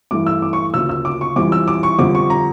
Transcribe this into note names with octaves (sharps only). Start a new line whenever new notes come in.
G2 E3 A3 E4 D6
E6
D6
C#6
D2 C#3 F3 A#3 E6
E6
D6
C#6
F2 E3 G3 D6
E6
D6
C#6
F2 D3 G3 D6
C#6
A#5